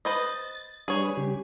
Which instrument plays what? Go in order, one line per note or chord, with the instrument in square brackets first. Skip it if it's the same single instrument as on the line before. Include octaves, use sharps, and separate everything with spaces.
[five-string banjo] B4 C5 D#5 [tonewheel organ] A6
[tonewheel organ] G3 D4 B4 [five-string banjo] G#4 C#5
[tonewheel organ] C#3 G3 G4